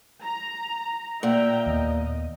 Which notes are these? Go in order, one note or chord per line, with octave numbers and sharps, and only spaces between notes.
A#5
A#2 E5 G5 A#5
D#2 B3 D#5